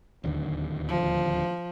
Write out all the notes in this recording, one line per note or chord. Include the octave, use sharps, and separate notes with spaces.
D1 D#2 D3
F3